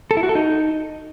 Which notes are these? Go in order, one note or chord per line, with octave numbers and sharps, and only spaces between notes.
A4
E4
F#4
A4
D#4